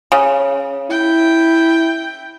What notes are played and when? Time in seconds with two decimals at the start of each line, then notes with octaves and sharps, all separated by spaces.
0.12 C#3
0.90 E4 G5